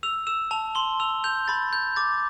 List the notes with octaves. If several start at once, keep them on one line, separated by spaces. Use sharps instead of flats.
E6 F7
E6 E7
A5 F7
C6 G7
E6 F7
G6 F7
B5 A6
G6
D6 A6